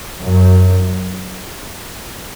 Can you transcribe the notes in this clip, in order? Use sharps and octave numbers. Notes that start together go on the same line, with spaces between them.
F#2